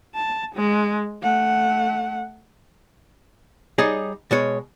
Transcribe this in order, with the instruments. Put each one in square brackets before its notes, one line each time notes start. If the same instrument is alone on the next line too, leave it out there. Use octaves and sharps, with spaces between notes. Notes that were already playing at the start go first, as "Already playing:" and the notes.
[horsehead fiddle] A5
G#3
A3 F#5
[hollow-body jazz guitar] G3 D#4 G#4 C#5 D#5
B2 G#3 C#5